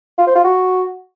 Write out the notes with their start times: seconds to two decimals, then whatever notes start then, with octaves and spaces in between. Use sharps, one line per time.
0.18 F4
0.27 C5
0.35 F4
0.44 F#4